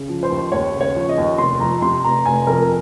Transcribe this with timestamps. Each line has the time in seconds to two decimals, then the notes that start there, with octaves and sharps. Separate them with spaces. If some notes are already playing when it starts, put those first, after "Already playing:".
Already playing: C#3
0.09 F3
0.23 C5
0.30 D#2
0.52 D#2 C#5
0.74 C#3
0.81 C#5
0.95 F3
1.09 D#5
1.18 D#2
1.38 F1 C6
1.60 F2 A#5
1.82 C3 C6
2.04 F1 A#5
2.25 F1 G#5
2.47 F2 A#4